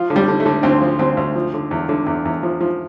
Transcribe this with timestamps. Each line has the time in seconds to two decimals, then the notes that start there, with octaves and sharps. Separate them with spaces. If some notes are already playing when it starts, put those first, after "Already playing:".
Already playing: F3 F4
0.10 D3
0.16 G3
0.28 D3
0.40 A3
0.46 D3
0.63 D2 C4
0.82 F3
0.99 D2 C4
1.17 D2
1.36 F3
1.54 D3
1.71 E2
1.89 D3
2.06 E2
2.25 E2
2.43 F3
2.60 F3